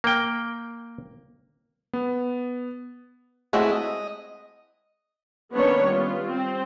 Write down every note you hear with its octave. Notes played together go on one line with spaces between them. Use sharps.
A#3 G5
B3
G#3 A3 C4 E4 F#4 G#4
D#5
D#3 A#3 B3 C#4 D4 C#5
G3 B3 F4
C4